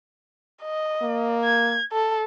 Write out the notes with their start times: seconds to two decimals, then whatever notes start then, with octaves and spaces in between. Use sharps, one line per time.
0.62 D#5
1.02 A#3
1.44 G#6
1.92 A4